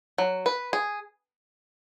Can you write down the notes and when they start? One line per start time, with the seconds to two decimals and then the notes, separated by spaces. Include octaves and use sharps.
0.18 F#3
0.46 B4
0.73 G#4